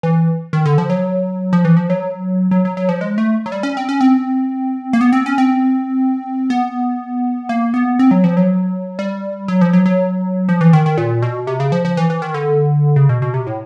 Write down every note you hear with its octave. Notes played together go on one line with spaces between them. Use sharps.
E3
D#3
D3
F3
F#3
F3
E3
F3
F#3
F#3
F#3
F#3
F3
G#3
A3
F#3
G3
C#4
C4
C#4
C4
A#3
B3
C4
C#4
C4
B3
A#3
B3
C4
F#3
F3
F#3
G3
F#3
F3
F#3
F#3
F3
E3
D#3
D#3
A#2
B2
C3
C#3
F3
F3
E3
E3
D#3
D3
C#3
B2
B2
C3
A2